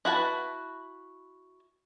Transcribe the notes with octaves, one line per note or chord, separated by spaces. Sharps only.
E4 F#4 B4 A5